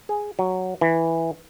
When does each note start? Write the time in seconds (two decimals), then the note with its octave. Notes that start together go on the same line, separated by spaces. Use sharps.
0.09 G#4
0.39 F#3
0.81 E3